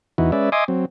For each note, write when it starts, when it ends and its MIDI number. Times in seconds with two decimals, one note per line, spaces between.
0.18 0.31 40
0.18 0.31 52
0.18 0.31 63
0.18 0.31 64
0.18 0.31 66
0.32 0.50 56
0.32 0.50 61
0.32 0.50 71
0.32 0.50 74
0.32 0.50 76
0.52 0.64 75
0.52 0.64 76
0.52 0.64 80
0.52 0.64 84
0.52 0.64 86
0.52 0.64 87
0.68 0.85 54
0.68 0.85 60